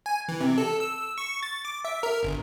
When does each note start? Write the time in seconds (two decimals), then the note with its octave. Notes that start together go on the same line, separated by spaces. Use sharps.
0.06 G#5
0.28 E3
0.41 C3
0.58 A4
0.80 E6
1.18 C#6
1.43 A6
1.65 D6
1.85 E5
2.03 A#4
2.23 G1